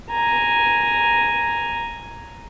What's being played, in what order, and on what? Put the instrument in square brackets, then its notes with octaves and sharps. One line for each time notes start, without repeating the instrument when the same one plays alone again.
[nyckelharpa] G#5 A#5